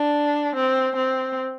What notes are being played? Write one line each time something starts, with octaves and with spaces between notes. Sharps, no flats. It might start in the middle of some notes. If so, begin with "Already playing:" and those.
Already playing: D4
C4
C4